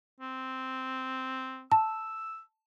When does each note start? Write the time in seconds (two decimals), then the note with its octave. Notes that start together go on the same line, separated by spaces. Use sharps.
0.20 C4
1.72 A5 E6